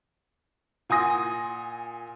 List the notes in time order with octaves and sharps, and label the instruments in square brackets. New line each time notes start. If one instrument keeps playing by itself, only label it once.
[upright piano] A#2 F#5 G#5 C6 D#6 A#6